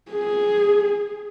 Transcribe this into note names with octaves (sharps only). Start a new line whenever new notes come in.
G#4